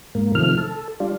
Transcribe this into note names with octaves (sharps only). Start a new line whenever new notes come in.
G#2 A#3
C3 D#3 F3 A3 F6
A4
G3 D4 F4